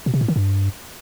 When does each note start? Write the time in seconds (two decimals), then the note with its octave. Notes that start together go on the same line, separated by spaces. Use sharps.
0.06 B2
0.14 C3
0.21 A2
0.28 D#3
0.36 G2